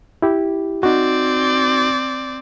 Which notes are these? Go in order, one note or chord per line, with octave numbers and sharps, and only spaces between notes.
E4 G4
C4 D#4 F#4 D5